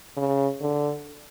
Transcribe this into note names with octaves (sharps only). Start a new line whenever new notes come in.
C#3
D3